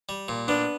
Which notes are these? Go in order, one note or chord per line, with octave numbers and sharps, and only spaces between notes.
G3
A#2
B3 D4